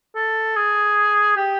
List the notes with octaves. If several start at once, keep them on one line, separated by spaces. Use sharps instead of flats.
A4
G#4
G4